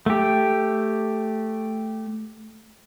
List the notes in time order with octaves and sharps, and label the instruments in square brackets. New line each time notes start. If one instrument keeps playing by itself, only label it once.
[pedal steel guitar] A3 G4